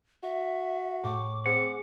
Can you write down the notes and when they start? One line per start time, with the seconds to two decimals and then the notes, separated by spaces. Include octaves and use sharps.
0.23 F#4 E5
1.03 A2 C#6 D6
1.46 C4 G#4 F#5